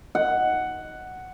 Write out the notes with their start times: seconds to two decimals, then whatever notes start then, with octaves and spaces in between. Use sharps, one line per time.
0.15 F#5